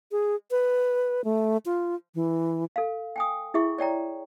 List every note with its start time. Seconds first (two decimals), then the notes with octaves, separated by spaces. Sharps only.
0.12 G#4
0.51 B4
1.24 A3
1.66 F4
2.15 E3
2.76 A4 F5
3.16 G5 G#5 D#6
3.54 E4 G#4 E5 C#6
3.78 C#5 D5 G5 A#5